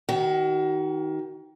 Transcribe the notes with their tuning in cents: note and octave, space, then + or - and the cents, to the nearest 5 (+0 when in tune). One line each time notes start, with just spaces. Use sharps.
D#3 +15 F#4 +35